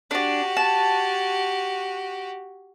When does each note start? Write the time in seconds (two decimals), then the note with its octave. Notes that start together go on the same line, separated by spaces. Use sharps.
0.11 D4 F#4 G4 D5
0.57 A5